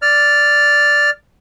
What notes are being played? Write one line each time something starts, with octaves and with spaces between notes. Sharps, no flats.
D5 F6